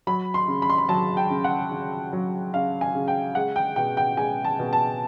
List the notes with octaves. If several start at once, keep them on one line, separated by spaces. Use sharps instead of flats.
F#3 B5
C6
C#3
B5
C6
B5
F#3 A5
G5
C#3
F#5
C#3
F#3
C#3 F5
G#5
C#3
G5
G#3 F#5
G5
B2 G5
G5
G#3 G#5
A5
B2
A5